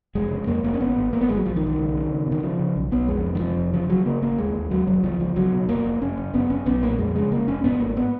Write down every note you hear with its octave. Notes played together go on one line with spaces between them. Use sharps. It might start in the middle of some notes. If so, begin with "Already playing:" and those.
F1 G#3
C#3
F2 A#3
F1 A#3
C#4
G#1 B3
G#1
G#1 A#3
B3
G#1 G#3
F#3
B1 F3
D#3
B1
D#3
C#2
C#3
C#2
B2
D#3
C#3 F3
C#3
B1
B1 B3
F2 G#3
F1
D#3
F2 F3
F1
C#3 F3
C#3 F#3
C#3 A#3
G#1 A#3
D#2 G#3
D#2
D#2 F#3
F1 F#3
C#2 F3
C#2 F3
C#2 F#3
B2
F1 A#3
F1
F#1 C#4
F#1
F#1 B3
F#1 C#4
B1 B3
A#2 A#3
F2 G#3
C#3 G#3
F1 A#3
F1 C#4
G#2 B3
G#1 A#3
B3